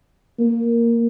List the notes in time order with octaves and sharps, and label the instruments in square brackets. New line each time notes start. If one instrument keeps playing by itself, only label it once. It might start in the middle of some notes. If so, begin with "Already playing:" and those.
[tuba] A#3